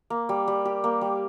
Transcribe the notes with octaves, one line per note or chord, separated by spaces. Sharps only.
A#3
G3
G3
G4
A#3
G3